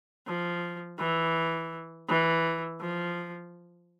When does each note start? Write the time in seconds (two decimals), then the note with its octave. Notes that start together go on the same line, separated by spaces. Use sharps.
0.27 F3
0.99 E3
2.09 E3
2.81 F3